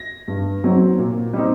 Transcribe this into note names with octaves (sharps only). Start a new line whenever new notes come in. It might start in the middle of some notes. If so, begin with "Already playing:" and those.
Already playing: A#6
G2
F#3 C4 D#4
A#2
G3 C4 D#4